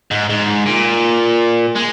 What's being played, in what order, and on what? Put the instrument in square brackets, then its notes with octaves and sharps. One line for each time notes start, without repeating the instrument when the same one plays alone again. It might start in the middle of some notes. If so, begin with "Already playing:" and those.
[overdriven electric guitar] G#2
G#2
A#2
G#3